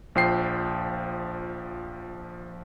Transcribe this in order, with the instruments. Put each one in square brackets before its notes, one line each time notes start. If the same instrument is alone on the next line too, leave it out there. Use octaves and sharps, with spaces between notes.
[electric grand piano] A#1 F3 G5 C7